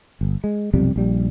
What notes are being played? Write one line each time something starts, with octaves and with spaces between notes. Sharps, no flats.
G1
G#3
B1 F2 C3 G3
A#1 G3